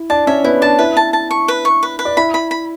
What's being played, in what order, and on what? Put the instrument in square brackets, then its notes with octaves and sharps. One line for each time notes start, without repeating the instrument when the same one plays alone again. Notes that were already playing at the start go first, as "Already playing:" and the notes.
Already playing: [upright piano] E4
[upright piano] D4 D5 [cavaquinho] A5
[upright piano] C#4 C#5 [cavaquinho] E5
[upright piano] B3 B4 [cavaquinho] E4
[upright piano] D4 D5 [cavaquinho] A5
[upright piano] E4 E5 [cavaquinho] B4
[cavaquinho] A5
A5
C#6
B4
C#6
B4
B4
[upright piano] D5
[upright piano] E4 E5 [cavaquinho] B5
[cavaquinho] B5
B5